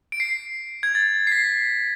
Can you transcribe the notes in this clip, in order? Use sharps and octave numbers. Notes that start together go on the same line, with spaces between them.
D7
C7
G#6
A6
C7
B6